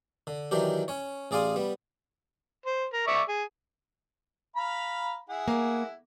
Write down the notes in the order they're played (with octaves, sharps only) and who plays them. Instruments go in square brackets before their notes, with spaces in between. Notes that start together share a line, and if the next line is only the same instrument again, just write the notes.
[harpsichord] D3
D#3 E3 F#3 D4 G4
C#4 C#5
A1 G#4 D5 F5 C6 D#6
G3 B3
[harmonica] C5
A#4
D5 E5 C#6
G#4
F5 A#5 B5
E4 G#4 F#5
[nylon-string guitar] A#3